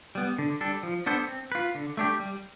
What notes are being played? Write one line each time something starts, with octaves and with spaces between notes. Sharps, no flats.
G3 B3
D3
G3 D4 A4
F3
B3 D4 A4 C5
C4
F4 B4
D3
A3 D4 G4
G3